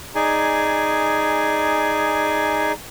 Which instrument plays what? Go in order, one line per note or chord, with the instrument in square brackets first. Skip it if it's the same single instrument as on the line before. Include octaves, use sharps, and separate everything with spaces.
[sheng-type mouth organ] D#4 G#4 D5 G#5